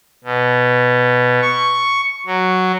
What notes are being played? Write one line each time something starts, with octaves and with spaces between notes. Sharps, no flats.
B2
C#6
F#3